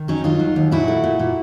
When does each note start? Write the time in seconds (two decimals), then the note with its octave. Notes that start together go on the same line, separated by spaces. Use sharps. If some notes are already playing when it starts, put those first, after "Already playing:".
Already playing: D#3
0.08 F#3 C#4 D#4
0.24 D#2 D#4 F4
0.40 F#3
0.56 D#2
0.72 A#2 E4 F#4
0.88 A3
1.04 A#2
1.19 A#2